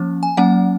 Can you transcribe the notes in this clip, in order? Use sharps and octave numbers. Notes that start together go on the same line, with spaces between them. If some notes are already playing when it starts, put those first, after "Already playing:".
Already playing: F3 A#3 C#4
G#5
F#3 A#3 C#4 F#5